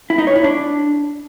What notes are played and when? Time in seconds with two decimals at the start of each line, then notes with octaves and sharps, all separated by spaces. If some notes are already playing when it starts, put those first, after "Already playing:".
0.10 E4
0.19 D#4
0.27 C#5
0.36 E4
0.44 D4